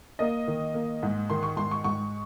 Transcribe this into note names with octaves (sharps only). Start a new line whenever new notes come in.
A#3 D#5
D#3
A#3
G#2
D#3 C6
C#6
G#2 C6
C#6
G#2 C#6